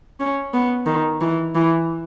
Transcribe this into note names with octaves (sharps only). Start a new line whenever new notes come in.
C#4
B3
D#3
E3
E3